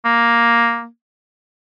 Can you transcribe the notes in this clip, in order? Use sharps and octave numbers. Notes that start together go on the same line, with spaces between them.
A#3